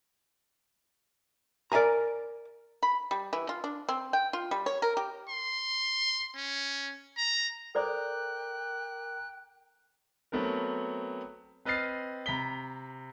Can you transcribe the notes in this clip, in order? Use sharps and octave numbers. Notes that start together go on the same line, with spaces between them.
A#4 D5 E5 G#5 A#5
B5
G3
E3
F4
D4
C4
G5
F4
G3
C#5
A#4
G4
C6
C#4
A#5
A4 A#4 C5 D5 G5 A#5 D6 F#6
F#3 A3 B3 C4 A#4
C4 B4 D#5 F6 A6 C7
C3 A#5 B5 B6 G7